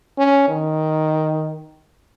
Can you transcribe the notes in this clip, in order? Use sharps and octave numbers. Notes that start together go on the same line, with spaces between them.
C#4
D#3